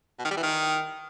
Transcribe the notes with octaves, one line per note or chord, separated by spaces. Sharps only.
B2
D#3
G3
E3
D#3